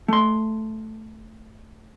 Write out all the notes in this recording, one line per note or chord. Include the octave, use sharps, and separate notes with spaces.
A3 C6